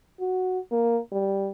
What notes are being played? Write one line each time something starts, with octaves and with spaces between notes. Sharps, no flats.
F#4
A#3
G3